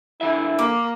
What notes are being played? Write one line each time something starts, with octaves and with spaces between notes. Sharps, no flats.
D3 F3 E4 E5
A#3 D6